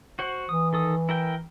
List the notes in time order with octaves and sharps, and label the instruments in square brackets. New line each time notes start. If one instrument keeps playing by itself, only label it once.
[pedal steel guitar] F#4 C5 F#5
[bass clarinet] E3 [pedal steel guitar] D#6
[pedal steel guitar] D#3 A4 D#6
E4 A#4 G5